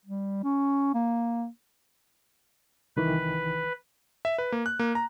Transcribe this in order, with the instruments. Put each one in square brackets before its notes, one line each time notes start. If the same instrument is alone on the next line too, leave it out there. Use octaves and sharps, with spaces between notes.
[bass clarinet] G3
C#4
A#3
[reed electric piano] C2 D#3 E3 [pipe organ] B4
[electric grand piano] E5
B4
A#3
F#6
A#3
A#5